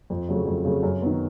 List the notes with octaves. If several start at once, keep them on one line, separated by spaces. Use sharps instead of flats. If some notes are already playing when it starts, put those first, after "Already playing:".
F2
C#3 F#3 A3
F2
C#3 F#3 A3
F#2
D#3 F#3 B3